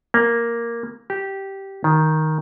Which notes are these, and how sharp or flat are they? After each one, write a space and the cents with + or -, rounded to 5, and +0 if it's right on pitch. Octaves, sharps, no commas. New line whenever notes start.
A#3 +0
G4 -10
D#3 +5